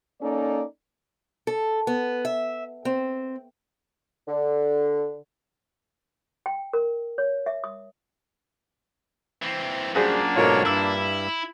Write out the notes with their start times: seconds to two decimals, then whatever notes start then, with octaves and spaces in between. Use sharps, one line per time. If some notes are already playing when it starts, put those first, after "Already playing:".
0.21 A#3 C#4 D#4 A4 D5
1.47 A4
1.87 B3
2.25 E5
2.85 C4
4.27 D3
6.46 G5
6.73 A#4
7.18 C#5
7.46 E5
7.64 D#6
9.42 E3 C4
9.95 F#2 A#2 G3 A#3 D4 F#4 G#4 C5
10.36 G#2 B2 F4 A4 A#4 C#5
10.65 G2 E4 E6